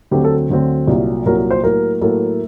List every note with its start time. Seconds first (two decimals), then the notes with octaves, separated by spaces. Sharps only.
0.11 D2 D3 F#3 C4 G4
0.24 A4
0.50 D2 D3 F#3 C4
0.87 C2 A#2 F#3
1.26 C2 A#2 F#3 A#4
1.38 A#4
1.51 C5
1.63 A2 F#3 A#3 A#4
2.01 A2 F#3 A#3 A4